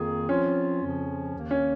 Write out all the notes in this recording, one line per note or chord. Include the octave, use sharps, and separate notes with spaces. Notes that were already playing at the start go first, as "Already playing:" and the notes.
Already playing: F2 D#3 A#3 F4 G#4
F3 C4 C#4 F4
F2 C#3 F3
D#2 D#3 A#3
C#4